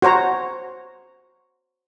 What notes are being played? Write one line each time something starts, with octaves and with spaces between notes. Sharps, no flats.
F#4 C5 C#5 A#5